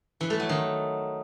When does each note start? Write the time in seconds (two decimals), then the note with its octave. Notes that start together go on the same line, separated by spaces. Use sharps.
0.21 E3
0.30 A3
0.40 F#3
0.49 D#3